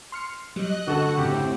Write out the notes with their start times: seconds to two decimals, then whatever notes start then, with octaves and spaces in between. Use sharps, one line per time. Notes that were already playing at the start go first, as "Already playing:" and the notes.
0.12 C6 F6 C#7
0.56 F#3 G3 D#5 F#6
0.87 D2 F#4 A4 D#5 F#5 E6
1.17 F#2 A2 C#3 C4 G4